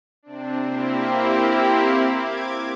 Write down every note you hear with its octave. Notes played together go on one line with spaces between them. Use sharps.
C3 C4 D4
A#3 C4 E4 G4
D6 G#6